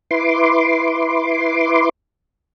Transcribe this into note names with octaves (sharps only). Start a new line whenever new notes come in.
E4 B4 C6 D6